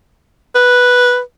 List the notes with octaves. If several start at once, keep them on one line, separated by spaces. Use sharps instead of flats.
B4